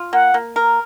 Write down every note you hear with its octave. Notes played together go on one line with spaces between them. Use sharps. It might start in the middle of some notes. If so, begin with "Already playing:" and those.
Already playing: F4
A#3 F#5
A#3
A#4